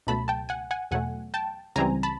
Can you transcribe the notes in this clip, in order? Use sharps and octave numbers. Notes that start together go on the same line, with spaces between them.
C#2 B2 F#3 A3 A5 B5
G5 A5
F#5 G#5
F#5 G#5
E2 B2 F#3 A3 F#5 G#5
G5 A5
C#2 C#3 E3 G3 C4 G#5 A#5
A5 B5